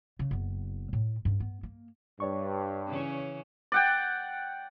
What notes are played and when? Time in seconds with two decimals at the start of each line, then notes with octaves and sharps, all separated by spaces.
0.19 C#3
0.31 F#1 B3
0.93 A2
1.25 G2 C#4
1.40 B3
1.63 A#3
2.20 G2 C#5 D5 C#6
2.87 C#3 E3 C#4
3.72 D5 F#5 G5